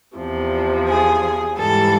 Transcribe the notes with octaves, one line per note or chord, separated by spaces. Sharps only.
E2 C3 F3
G#4
G#2 E3 G3 A4